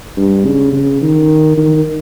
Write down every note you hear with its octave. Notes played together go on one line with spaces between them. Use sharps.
G2
C#3
C#3
D#3
D#3